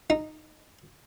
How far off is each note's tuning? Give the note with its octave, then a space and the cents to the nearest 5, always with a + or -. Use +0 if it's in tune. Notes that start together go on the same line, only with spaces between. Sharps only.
D#4 -10